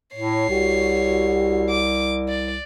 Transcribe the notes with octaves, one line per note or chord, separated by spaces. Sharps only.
A2 C#5 C7
C2 F#4 G4
D6
D5